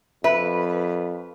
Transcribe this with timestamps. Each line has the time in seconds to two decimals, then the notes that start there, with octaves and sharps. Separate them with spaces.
0.24 F2 B4 E5